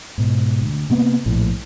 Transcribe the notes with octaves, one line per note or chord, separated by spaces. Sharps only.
G#2 B2
D2
C3 A#3 B3
A#1 A2